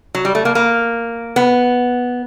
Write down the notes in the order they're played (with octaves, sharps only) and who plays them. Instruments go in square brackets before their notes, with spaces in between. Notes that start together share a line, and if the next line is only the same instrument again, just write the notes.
[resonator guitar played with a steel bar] F#3
G3
A3
A#3
A#3
B3